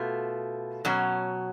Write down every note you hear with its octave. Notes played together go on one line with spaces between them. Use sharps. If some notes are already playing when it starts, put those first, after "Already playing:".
Already playing: B2 A3 F4
B2 F#3 C#4